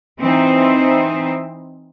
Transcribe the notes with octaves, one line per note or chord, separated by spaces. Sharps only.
E3 C4 D#4 C5 E5